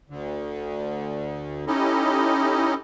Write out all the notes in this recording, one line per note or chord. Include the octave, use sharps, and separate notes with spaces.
D2 D3
C#4 D#4 E4 G4 A4 D#5